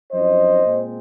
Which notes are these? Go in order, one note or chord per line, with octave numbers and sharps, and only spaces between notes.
F#2 F3 C4 D#4 C5 D#5
A#2 G#3 C4